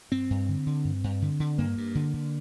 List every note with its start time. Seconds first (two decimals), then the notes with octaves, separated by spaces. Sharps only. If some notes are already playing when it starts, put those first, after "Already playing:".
0.12 G2 C4
0.30 G2
0.49 D3
0.66 D3
0.85 G2
1.04 G2
1.22 D3
1.40 D3
1.58 G2 A#3
1.78 G2
1.95 D3
2.14 D3